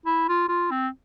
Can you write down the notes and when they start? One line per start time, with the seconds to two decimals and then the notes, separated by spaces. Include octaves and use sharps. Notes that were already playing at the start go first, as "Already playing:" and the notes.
0.06 E4
0.28 F4
0.48 F4
0.71 C4